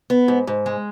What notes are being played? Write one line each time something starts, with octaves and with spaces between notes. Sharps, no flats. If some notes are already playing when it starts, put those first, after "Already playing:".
B3
G#2
G#2
G#3